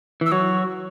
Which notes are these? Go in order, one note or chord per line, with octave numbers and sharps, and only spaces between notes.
E3 E6
F#3 C#6